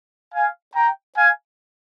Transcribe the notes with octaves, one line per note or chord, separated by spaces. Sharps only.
F5 G#5
G5 A#5
F5 G#5